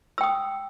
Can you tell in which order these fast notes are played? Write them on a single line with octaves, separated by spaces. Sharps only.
E6 G5 D#6